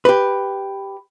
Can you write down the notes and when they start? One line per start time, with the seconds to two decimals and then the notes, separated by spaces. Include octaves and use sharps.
0.05 G4 B4